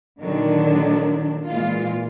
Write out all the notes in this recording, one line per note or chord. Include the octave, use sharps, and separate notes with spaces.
A#2 D3 D#3 F#3 D4
A#2 E3 G#3 F4